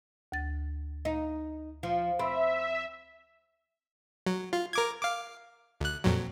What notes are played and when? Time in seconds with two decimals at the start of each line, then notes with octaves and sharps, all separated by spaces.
0.32 D2 A6
1.05 D#4
1.83 F3
2.19 C4 E5 B5
4.27 F#3
4.53 F4
4.73 A#4 D6 G#6
5.02 F5 D6
5.81 D2 F#6
6.04 F2 A#2 F#3